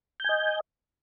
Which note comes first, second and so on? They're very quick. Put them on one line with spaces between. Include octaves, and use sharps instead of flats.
G6 G#5 D#5